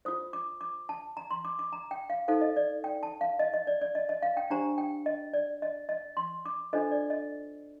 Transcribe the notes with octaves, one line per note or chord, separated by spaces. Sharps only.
F4 C5 D#6
D6
D6
A5
A#5
C6
D6
D6
A#5
G5
F5
D#4 A4 C5 F5
D#5
D5
G5
A5
F5
D#5
D#5
D5
D5
D#5
D#5
F5
G5
D4 G4 C5 A#5
G5
D#5
D5
D#5
D#5
C6
D6
D4 F4 A4 C5 D#5
D5
D#5